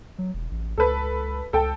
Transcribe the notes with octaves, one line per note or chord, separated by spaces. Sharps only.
F#3
E1
A1
C#2 A4 B4
C#2 A4 G5